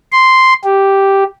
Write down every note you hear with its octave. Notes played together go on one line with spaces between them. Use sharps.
C6
G4